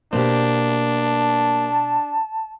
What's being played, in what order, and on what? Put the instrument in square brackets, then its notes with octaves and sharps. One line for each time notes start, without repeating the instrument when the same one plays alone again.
[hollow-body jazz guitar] B2 C5 [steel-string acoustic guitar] A#3 G4 [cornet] D4
[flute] A5